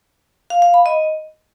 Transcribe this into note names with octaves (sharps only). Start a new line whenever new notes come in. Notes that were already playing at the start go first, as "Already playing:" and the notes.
F5
F5
B5
D#5